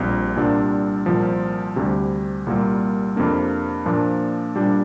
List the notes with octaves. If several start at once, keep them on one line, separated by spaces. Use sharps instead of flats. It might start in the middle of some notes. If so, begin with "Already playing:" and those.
Already playing: A#1 A#2 G3 C4
C2 A#2 G3 D4
C2 A#2 F3
D2 C3 G3
C2 A#2 G3 A#3
F2 C3 A#3 D4
A#2 F3 A#3 D4
A#2 G3 D4